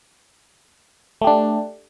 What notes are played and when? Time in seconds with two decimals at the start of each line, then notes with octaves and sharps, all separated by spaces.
1.21 A3
1.24 G4
1.27 D4